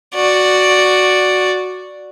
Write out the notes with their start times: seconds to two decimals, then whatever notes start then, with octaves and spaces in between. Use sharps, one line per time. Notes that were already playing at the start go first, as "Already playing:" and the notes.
0.15 F#4 D5